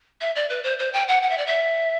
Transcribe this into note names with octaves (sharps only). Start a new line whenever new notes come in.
E5
D5
B4
C5
C5
G5
F#5
F#5
E5
D5
E5